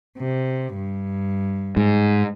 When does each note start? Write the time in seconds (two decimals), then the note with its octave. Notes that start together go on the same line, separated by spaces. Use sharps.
0.18 C3
0.76 G2
1.77 G#2